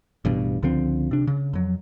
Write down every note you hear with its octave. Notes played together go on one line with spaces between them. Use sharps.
A1 G2 B2
C#2 D3 F3 C4
C3 D4
C#3
F2 F#3